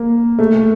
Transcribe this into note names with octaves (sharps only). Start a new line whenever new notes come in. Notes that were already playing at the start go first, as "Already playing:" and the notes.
Already playing: A#3
A3